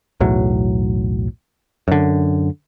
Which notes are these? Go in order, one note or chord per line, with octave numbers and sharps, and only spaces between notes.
B1 E2 A2 F#3
F#2 D3